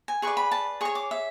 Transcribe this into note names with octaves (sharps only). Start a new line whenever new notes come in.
G#5
G#4 B4 D5 C#6
B5
A5
G#4 C#5 C#6
D6
E5